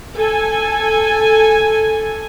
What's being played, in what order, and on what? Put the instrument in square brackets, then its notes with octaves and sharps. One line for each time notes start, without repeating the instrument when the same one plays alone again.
[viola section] A4 G#5